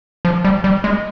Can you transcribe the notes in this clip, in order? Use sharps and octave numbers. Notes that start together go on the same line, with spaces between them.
F3
G3
G3
G#3